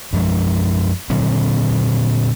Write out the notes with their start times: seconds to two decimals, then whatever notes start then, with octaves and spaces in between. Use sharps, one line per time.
0.13 F#2 F3 G#3
1.10 A#2 D3 F#3 C4